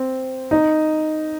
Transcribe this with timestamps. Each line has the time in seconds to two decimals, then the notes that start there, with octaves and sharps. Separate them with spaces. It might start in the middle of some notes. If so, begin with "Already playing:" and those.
Already playing: C4
0.51 D#4